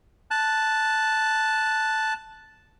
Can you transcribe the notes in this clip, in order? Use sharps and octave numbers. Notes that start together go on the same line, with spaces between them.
A5 F#6